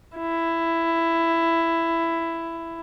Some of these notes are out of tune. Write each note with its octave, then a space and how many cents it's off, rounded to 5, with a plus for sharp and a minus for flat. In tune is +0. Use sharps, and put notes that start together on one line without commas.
E4 +10